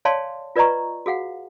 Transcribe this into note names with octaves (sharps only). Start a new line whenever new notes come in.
C#5 D5 F5 G#5 A5 C6
F4 B4 D5 D#5 A#5 C#6
F#4 G#4 F5 F#5